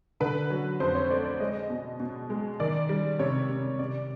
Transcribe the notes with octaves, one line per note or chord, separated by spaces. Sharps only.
D3 B4
F#3
F2 C5
C#5
A3 D5
D5
G#3 D#5
B2
B2
G#3
D#3 D5
G3
C3 C#5
C3
C3 D5